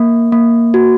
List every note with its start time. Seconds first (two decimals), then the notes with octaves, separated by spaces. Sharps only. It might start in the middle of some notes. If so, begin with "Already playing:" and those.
Already playing: A#3
0.32 A#3
0.74 F#4